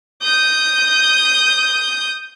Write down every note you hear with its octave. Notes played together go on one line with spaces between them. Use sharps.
D#6 G6